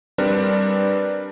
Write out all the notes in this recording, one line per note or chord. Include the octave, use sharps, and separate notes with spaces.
G3 C4 D4 A#4 B4